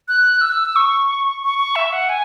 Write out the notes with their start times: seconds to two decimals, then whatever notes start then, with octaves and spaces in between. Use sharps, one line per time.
0.08 F#6
0.41 E6
0.76 C#6
1.43 C#6
1.59 C#6
1.76 E5
1.93 F#5
2.09 G#5